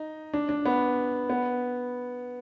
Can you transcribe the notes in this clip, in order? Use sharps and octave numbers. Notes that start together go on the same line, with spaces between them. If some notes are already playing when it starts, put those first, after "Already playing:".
Already playing: D#4
D4
D4
B3
B3